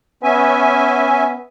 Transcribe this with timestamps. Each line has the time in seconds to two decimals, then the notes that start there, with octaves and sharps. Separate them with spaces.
0.23 B3 C#4 E5 G#5